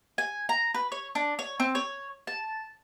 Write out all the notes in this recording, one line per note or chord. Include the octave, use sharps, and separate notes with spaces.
G#5
A#5
B4
C#5
D4
C#5
C4
C#5
A5